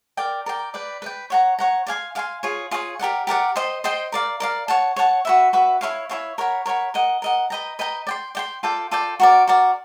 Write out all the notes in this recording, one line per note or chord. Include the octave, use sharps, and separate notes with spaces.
A#4 D5 G5
A#4 D5 G5
B4 D5 G5
B4 D5 G5
C#5 F#5 A#5
C#5 F#5 A#5
D5 F5 G#5 C6
D5 F5 G#5 C6
F4 G#4 C#5
F4 G#4 C#5
G4 A#4 D5 F#5
G4 A#4 D5 F#5
C5 D#5 G5 C6
C5 D#5 G5 C6
A#4 D5 F5
A#4 D5 F5
C#5 F#5 A5
C#5 F#5 A5
F#4 B4 E5
F#4 B4 E5
E4 G#4 C#5 F5
E4 G#4 C#5 F5
A#4 C#5 F#5 B5
A#4 C#5 F#5 B5
A#4 D#5 F#5
A#4 D#5 F#5
B4 D#5 G5 A#5
B4 D#5 G5 A#5
D5 G5 C6
D5 G5 C6
F4 A4 D5 G5
F4 A4 D5 G5
F#4 A#4 D5
F#4 A#4 D5